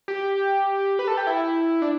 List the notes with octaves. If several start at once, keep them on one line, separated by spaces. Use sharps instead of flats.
G4
B4
A4
G4
E4
D4